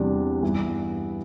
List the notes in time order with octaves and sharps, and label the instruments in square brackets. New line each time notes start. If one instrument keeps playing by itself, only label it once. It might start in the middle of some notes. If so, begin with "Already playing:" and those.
Already playing: [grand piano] E2 C3 G3 D4
G2 E3 B3 E4